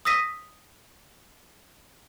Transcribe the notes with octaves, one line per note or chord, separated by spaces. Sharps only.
D#6 E6 A#6 B6 D#7